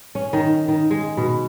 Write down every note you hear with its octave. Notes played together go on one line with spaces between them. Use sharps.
C#4
D#3
D#3
G#3
B2